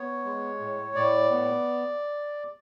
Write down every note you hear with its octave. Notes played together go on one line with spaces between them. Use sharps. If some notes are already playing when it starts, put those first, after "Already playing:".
Already playing: B3 C#5
G#3
A2
A2 D5
B3